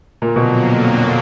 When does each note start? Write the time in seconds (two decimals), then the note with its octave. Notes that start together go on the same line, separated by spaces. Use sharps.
0.21 F2 A#2 D3 F#3 A#3
0.36 B2